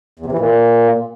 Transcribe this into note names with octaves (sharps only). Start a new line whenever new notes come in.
E2
C3
E3
A#2